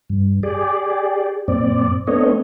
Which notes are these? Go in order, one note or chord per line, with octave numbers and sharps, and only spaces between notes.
G2
G4 G#4 D5
F#2 A#2 C4 D5
A3 B3 C4 D4 C#5 D#5